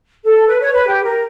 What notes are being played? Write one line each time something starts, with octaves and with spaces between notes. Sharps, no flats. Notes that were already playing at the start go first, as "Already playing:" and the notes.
A4
B4
C#5
B4
G4
A#4